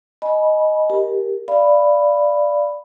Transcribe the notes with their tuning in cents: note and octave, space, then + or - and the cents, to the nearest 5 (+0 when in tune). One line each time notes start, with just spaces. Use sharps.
D#5 +0 G#5 +35 B5 -15
G4 +0 A#4 +0
D5 +0 F5 -25 B5 +0